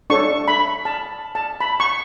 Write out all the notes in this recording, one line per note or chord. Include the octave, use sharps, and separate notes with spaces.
D4 A4 C#5 C#6
B5
A5
A5
B5
C#6